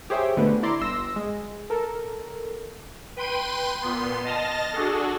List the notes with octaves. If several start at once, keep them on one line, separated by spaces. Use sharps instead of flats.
G4 G#4 C5 C#5 E5 G5
B2 D3 A3 B4
E4 D5 A#5 C6 D6
G1 C6 E6 A#6
G#3
A4 A#4
B4 G5 C6 D#7
A#2 B3 C6
D#5 A5 F6 A6 A#6
D4 F#4 G#4 A4